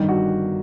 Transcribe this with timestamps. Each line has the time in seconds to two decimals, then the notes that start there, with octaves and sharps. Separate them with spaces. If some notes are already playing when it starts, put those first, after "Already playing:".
Already playing: G1 G2 D#3 G3
0.09 F#4